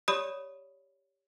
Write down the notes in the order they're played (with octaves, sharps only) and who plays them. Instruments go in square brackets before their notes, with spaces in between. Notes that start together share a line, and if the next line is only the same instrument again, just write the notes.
[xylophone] G4 C#5 D5 B5 D#6 E7